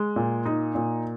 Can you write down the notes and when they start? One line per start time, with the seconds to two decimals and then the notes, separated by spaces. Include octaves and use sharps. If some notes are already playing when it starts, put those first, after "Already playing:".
Already playing: G#3
0.16 A#2
0.46 D#4
0.75 A#2